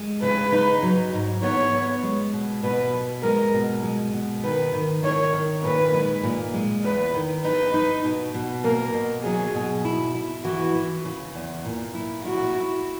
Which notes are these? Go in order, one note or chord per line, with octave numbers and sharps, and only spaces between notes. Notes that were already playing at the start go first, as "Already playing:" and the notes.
Already playing: G#3
C#3 B4
D#4
F#3
G#2
B3 C#5
B3
G#3
B2
B2 B4
B3
G#3 A#4
B2
G#3
B2
D#3 B4
D#3
D#3 C#5
D#3
A#2 B4
G#3
A#2
G#3
E2 B4
D#3
D#4 B4
D#4
B2
B2
A#3 A#4
B2
F#3 G#4
B2
E4
E4
E3 F#4
E3
C#3
E2
A#2
E4
E4 F#4
E4